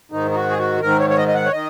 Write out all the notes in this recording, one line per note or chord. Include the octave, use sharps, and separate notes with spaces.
G#2 D#3 D#4
D#4
F#4
G#4
F#4
G#2 D#3 A#4
C#5
C#5
D#5
D#5
F#5
C#5
D#3 D#5